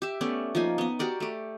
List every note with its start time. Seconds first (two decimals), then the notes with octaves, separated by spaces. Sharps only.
0.02 G4 E5
0.21 A3 B3 C#4 D5
0.55 F3 A#3 D#4 G#5
0.78 B3 D#5
0.99 F#4 G4 A#4 D5
1.20 A3 G4